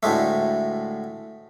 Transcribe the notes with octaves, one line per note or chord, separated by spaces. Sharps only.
D2 A2 G#3 A3